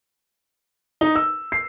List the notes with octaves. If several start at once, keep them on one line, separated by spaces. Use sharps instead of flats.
D#4
E6
C7